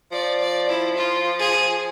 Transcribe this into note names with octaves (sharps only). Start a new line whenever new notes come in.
F3 D5
D5
E4
F4
G#4